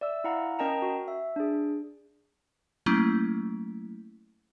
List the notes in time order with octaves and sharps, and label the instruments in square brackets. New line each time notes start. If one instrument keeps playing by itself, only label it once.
[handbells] D5 E5 E6
E4 F5 F#5 A#5
C#4 A#4 D#5 G5 A5 A#5
F#4
E5
D4 G#4
[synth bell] F#3 A3 A#3 C#4 E4